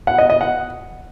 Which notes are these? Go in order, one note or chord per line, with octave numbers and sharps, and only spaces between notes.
F#5
D#5
D#5
F#5